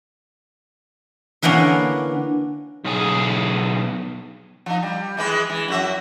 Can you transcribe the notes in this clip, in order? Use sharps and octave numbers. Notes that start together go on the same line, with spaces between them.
D3 E3 A#3 B3 C#4 D4
B1 G#4
F3 D#4
G3
E3 G#3 B4
E3
F#2 F#4 E5